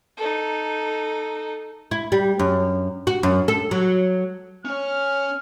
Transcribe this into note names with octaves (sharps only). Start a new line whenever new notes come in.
D#4 A4
E4
G3
F#2
F#4
F#2
A4
F#3
C#4 C#5 F6